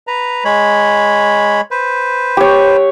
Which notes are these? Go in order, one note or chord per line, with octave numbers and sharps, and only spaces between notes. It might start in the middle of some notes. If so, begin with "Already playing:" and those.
B4 A#5
G#3 C#5 B5
B4 C5
G4 C#5